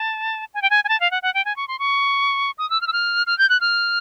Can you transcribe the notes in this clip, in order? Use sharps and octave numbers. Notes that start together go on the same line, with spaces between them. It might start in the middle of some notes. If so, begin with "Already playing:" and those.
Already playing: A5
G#5
G5
G#5
G#5
A5
F5
F#5
F#5
G5
G#5
C#6
C6
C#6
D#6
E6
F6
E6
F6
F6
G6
F#6
F6